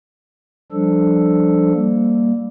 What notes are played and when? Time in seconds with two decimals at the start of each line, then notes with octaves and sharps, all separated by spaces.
0.72 F3 G3 D4 A4
1.73 G3 A#3